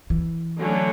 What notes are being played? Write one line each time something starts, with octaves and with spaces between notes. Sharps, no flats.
E3
D3 F#3 A3 C#4